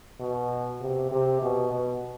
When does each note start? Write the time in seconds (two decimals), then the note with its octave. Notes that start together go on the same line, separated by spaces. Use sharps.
0.20 B2
0.81 C3
1.11 C3
1.42 B2
1.72 B2